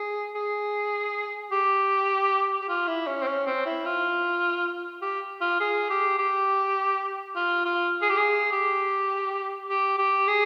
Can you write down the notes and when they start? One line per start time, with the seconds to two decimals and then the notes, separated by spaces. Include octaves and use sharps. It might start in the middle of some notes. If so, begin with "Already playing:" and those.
Already playing: G#4
0.35 G#4
1.52 G4
2.62 G4
2.69 F4
2.87 E4
3.07 C#4
3.22 C4
3.27 C#4
3.46 C4
3.66 E4
3.85 F4
5.02 G4
5.41 F4
5.60 G#4
5.90 G4
6.19 G4
7.36 F4
7.65 F4
8.02 G#4
8.09 G4
8.17 G#4
8.52 G4
9.69 G4
9.98 G4
10.28 G#4